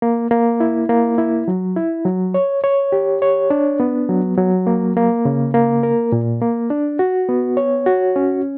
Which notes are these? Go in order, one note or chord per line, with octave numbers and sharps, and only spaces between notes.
A#3
A#3
E4
A#3
E4
F#3
E4
F#3
C#5
C#5
G4
C#5
D4
B3
F#3
F#3
A#3
A#3
C#3
A#3
A#4
A#2
A#3
D4
F#4
B3
C#5
F#4
C#4